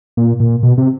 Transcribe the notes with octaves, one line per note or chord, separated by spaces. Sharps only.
A#2
A#2
B2
C3